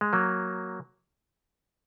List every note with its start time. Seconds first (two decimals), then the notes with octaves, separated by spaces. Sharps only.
0.01 G#3
0.13 F#3 A#3